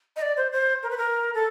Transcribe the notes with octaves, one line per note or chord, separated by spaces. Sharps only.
D#5
D5
C5
C5
A#4
B4
A#4
A4